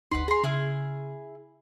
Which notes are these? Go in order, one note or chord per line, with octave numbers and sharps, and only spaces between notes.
G1 D2 D#4 B4 F#5 C6
G#4 G#5 A#5 C6
C#3 E4 G#4 F6